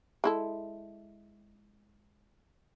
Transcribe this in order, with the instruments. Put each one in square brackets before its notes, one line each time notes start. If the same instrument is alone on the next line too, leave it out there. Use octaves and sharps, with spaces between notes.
[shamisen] G#3 E4 A4